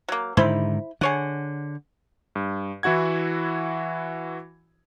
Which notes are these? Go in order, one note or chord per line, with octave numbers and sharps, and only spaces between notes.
F#3 A#3
G#2 D3 D#3 E4 C5 B5
D3 G#4 C#5 F#5
G2
E3 E4 F#4 F#5 G#6